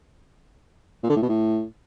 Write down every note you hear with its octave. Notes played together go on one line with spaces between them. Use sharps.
A#2
D3
A2
B2
A2